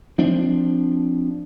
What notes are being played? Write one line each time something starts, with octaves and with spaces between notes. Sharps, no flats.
F3 C4 D4